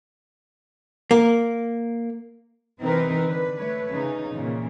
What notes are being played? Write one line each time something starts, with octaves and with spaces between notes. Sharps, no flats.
A#3
C3 E3 C4 D#4 A#4 B4
D3 B4
A3 B4 C#5
C#3 D#4
A#2 C#3 E3